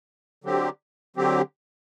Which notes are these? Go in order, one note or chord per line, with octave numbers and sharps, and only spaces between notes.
D3 F#3 C4 G4
D3 F#3 C4 G4